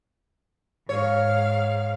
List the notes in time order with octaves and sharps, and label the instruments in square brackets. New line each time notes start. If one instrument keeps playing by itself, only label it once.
[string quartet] G#2 F5 [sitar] C#5